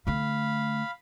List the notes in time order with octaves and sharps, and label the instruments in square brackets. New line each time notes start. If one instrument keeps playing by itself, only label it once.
[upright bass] D3 A3 [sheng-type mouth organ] F5 B5